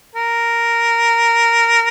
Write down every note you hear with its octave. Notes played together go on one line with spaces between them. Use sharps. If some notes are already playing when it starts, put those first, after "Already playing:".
A#4